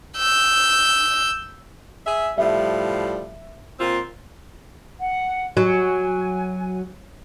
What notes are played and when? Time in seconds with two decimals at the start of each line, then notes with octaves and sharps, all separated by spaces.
0.17 E6 G6
2.06 G#4 E5
2.38 A2 F3 G3 E5
3.80 A#2 C4 F4
4.99 F#5
5.57 F#3 G#5